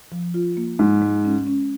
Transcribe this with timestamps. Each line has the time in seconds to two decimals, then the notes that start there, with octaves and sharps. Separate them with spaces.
0.12 F3
0.34 F4
0.57 A#3
0.79 G#2 G#3
1.02 G#3
1.25 C#4
1.47 C#4